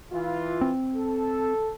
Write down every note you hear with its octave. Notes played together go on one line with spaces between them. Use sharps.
E3 F4
C4
A4